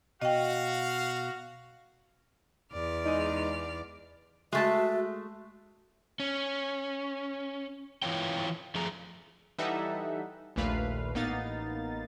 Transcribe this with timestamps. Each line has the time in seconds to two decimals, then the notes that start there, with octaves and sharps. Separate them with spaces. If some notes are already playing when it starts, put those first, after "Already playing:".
0.22 B2 F#4 D#5 F5 G5
2.73 E2 D5 F6
3.05 G#3 D#4
4.53 G#3 A3 F#4 E5 A5
6.20 C#4
8.02 E3 E4 F4 C#5 G5
8.75 F3 A3 G#4 A#5
9.58 E3 G3 D#4 A4 E5 F#5
10.56 A#1 D#2 A#2 A3 B4 F5
11.14 A1 A#3 B3 D#4 F5 A6